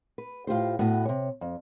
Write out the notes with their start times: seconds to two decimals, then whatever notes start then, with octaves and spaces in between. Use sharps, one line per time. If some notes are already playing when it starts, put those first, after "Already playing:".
0.18 B4
0.47 A2 F4 G4 C5
0.79 A2 B3 F#4 E5
1.06 C3 C#5
1.41 F2